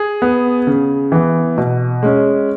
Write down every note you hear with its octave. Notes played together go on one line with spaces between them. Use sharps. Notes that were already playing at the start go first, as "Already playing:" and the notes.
Already playing: G#4
B3
C#3
E3 B3
B2
G#3 C#4